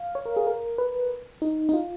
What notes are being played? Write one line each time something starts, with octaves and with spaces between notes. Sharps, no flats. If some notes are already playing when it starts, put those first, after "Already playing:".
Already playing: F5
C#5
A#4
G#4
A#4
B4
D#4
D#4
F4